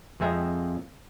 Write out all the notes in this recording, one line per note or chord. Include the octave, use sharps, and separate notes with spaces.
F2 G#3 C4 E5 A#5